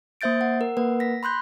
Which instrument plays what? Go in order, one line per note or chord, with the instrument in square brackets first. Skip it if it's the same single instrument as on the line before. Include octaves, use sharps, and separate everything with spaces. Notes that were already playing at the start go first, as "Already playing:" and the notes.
[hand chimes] A#3 C5 E5 G6 A6 D7
F#5
A#4
A#3 A#4 B4 F#5
A#6 B6
B5 C6 F#6 G6